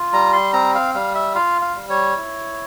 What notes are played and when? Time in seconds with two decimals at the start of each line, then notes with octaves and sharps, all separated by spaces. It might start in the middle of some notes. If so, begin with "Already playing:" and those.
Already playing: F4
0.13 G3 A#5
0.33 C6
0.53 C4 A#5
0.75 F5
0.94 G3 F5
1.15 E5
1.35 F4 F5
1.62 F5
1.75 G3
1.90 C#5
2.16 E4